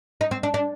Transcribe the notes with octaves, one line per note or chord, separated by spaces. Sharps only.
D#4
C4
D4
D4